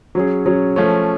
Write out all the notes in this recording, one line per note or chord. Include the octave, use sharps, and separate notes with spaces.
F#3 C#4 G#4
F#3 C#4 G#4
F3 A3 C#4